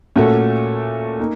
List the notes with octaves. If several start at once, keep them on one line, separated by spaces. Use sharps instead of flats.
A#2 A3 C#4 F#4 A4
A#3 D#4